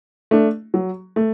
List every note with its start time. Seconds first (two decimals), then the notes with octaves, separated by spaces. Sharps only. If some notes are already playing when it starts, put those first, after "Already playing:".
0.31 A3 D4
0.74 F#3
1.16 A3